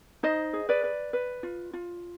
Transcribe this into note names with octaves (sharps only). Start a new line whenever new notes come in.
D#4 C5 D#5
G#4
B4 D5
B4
B4
F4
F4